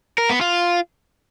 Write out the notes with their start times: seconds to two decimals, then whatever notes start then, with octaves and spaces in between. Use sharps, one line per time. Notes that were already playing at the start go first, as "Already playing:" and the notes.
0.18 A#4
0.30 B3
0.41 F4